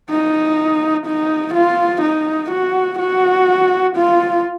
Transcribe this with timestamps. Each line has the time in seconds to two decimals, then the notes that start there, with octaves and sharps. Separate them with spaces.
0.10 D#4
1.06 D#4
1.54 F4
2.02 D#4
2.51 F#4
2.99 F#4
3.96 F4